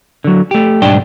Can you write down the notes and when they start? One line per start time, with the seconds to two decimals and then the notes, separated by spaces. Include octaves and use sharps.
0.24 D3 F#3
0.51 A3 G4
0.82 B1 G#2 G3 D4 G5